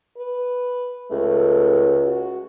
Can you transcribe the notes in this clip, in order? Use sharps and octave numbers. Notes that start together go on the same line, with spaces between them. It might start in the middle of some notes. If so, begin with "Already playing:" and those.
B4
C#2 A3
F#4